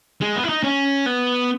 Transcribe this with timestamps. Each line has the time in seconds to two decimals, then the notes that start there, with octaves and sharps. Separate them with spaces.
0.21 G#3
0.36 B3
0.44 E4
0.49 D#4
0.63 C#4
1.06 B3